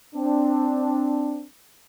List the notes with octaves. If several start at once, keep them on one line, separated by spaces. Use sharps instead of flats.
C4 D4